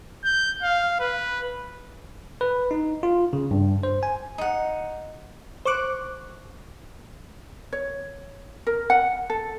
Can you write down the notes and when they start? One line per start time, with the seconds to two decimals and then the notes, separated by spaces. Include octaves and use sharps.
0.25 G6
0.63 F5
1.00 B4
2.41 B4
2.71 D#4
3.03 F4
3.33 C#3
3.51 G2
3.83 C5
4.03 G#5
4.38 D#4 F#5
5.65 C5 C#6 D6 F#6
7.73 C#5
8.67 A#4
8.90 F#5
9.30 A4